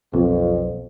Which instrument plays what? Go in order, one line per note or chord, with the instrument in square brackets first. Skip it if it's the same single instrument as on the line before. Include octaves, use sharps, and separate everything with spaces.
[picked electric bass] B1 [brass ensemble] F2